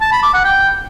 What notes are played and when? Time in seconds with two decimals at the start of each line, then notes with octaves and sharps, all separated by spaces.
0.01 A5
0.12 B5
0.23 D6
0.34 F#5
0.45 G5